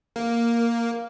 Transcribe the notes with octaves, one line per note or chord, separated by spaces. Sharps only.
A#3